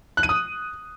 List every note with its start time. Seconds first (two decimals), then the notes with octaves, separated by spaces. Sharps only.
0.17 F#6
0.23 D#7
0.29 D#6